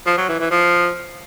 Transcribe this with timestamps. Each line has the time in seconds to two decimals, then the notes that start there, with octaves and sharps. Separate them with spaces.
0.06 F3
0.17 F#3
0.28 E3
0.40 E3
0.51 F3